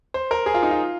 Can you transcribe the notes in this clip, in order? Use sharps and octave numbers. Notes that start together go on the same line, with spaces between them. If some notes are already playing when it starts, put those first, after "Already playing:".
C5
A#4
G#4
F4
D#4
F4